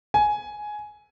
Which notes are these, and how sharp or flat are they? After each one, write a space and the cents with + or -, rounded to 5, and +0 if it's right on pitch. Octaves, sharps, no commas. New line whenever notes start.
G#5 +10